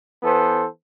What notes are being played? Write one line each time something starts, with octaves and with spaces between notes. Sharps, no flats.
E3 B3 A4 C5